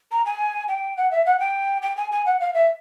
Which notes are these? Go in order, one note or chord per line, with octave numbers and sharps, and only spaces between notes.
A#5
G#5
G5
F#5
E5
F#5
G5
G5
G#5
G#5
F#5
F5
E5